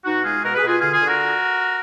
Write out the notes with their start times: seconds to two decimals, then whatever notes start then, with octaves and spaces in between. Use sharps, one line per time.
0.04 B2 D#4 F#4
0.23 G#3 F4 G#4
0.42 B2 F#4 A#4
0.54 G#4 B4
0.61 B2
0.67 F4 G#4
0.80 D3 F4 G#4
0.92 F4 G#4
0.99 D3
1.05 F#4 A#4